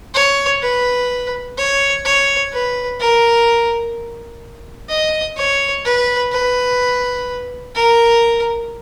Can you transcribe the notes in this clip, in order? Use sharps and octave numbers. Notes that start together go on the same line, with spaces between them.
C#5
B4
C#5
C#5
B4
A#4
D#5
C#5
B4
B4
A#4